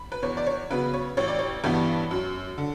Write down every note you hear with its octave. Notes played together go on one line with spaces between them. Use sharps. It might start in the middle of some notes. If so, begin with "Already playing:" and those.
Already playing: B5
B4
E2 C#5
D5
C#5
C#3 F#3 B3 B4
C#5
A1 C#5
D5
C#5
G2 E3 G3 B3
F#2
D3